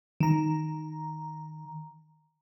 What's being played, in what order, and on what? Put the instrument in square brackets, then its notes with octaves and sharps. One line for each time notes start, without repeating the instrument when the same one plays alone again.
[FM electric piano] D#3 A#5